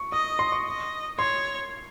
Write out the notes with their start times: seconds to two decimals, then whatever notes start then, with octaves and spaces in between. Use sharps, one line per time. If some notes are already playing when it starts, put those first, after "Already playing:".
Already playing: C#6
0.12 D#5 D#6
0.39 C6
0.52 C#6
0.66 D#5
1.19 C#5 C6